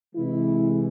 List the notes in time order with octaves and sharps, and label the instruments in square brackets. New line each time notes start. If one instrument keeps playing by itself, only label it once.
[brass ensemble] C3 E3 G#3 E4